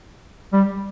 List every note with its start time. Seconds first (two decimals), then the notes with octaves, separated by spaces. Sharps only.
0.53 G3